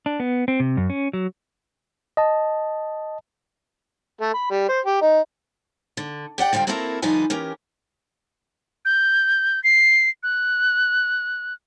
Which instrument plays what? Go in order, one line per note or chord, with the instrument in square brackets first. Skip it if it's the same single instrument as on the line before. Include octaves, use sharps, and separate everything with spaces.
[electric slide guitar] D4
B3
C4
C3
F#2
C#4
F#3
[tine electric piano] D#5 A5
[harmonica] A3
B5
G3
C5
G4
D#4
[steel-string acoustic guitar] D3
G4 D5 F#5 G5
D3 F3 G3 F5 G5
A#3 C4 E4 F#4 A4 A#4
D2 F3 G3 D#4 B4 G#5
E3 C#4 G4 A#4
[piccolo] G6
C7
F#6